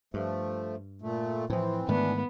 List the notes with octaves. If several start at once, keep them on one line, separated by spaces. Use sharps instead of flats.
G2 F3 A3
A#2 A3
A2 E3 F3 C4
G#2 D#3 E3 A3 B3 D4